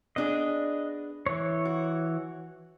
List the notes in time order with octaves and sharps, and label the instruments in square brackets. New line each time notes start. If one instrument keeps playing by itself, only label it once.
[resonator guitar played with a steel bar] B3 D4 G#4 [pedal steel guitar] D#5
[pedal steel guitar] E3 C#5
[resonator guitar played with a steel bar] F#4